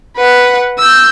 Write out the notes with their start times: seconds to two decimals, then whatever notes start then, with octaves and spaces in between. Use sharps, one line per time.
0.17 B4 F#5
0.79 E6 G6